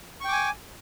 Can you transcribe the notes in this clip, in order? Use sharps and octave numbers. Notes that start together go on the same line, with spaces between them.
G5 G#5 C#6 D6